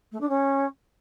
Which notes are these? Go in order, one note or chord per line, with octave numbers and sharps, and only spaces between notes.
A3
D4
C#4